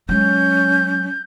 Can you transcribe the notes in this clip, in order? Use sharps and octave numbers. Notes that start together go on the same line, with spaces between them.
F#3 G#3 C#4 G6